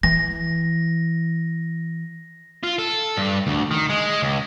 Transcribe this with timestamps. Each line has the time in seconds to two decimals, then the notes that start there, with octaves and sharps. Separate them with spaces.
0.03 E3 A#6
2.63 F4
2.78 A4
3.17 G2
3.47 D2
3.71 D#3
3.89 G#3
4.22 C#2